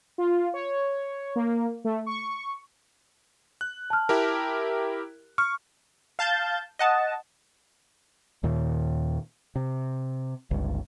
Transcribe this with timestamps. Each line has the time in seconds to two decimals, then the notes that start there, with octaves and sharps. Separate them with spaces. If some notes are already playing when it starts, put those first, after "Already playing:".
0.18 F4
0.54 C#5
1.36 A#3
1.84 A3
2.06 C#6
3.61 F#6
3.90 A5 F6
4.09 E4 G4 A#4
5.38 C#6 F6
6.19 F5 A5 G6 A6
6.79 D#5 F#5 A5
8.43 D#2 A#2 D#3
9.56 C3
10.51 G1 C#2